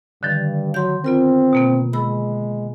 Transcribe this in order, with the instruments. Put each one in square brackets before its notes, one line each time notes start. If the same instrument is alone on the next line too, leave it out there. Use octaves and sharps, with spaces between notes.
[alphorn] G2 [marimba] D3 D#3 F3
[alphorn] F#3 [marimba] C6 G6
[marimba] B3 F4 A#4 [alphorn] C4
[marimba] B2 A#3 B3
[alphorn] G#3 [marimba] B5 E6